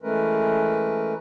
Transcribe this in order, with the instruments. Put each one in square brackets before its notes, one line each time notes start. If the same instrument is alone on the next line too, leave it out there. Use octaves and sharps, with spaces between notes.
[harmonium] E3 G#3 A3 C#4 A#4 B4